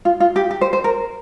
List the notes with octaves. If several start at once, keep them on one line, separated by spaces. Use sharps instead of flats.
F4
F4
G4
G4
C5
C5
A#4